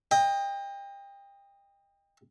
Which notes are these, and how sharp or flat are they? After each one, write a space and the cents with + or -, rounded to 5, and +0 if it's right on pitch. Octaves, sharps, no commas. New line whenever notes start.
D#5 +0 G5 +30